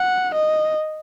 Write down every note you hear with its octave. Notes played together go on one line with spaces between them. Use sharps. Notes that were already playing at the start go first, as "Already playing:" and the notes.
Already playing: F#5
D#5